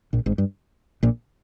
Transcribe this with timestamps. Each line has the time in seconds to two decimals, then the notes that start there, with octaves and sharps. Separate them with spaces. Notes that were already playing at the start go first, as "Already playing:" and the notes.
0.13 A#1 A#2
0.26 G#1 G#2
0.38 G2
1.03 A#1 A#2